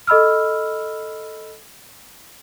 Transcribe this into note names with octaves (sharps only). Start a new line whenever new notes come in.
A4 D#5 B5 E6 F6